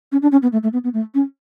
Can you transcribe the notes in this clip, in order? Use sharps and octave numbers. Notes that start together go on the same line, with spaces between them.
C#4
D4
C#4
B3
A3
A3
B3
B3
A3
C#4